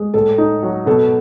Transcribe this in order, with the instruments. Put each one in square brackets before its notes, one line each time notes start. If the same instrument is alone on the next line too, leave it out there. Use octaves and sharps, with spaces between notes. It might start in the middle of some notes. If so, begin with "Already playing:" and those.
Already playing: [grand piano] G#3
[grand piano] A2 [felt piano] A4
[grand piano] D#4
F#3
[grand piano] B2 [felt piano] A4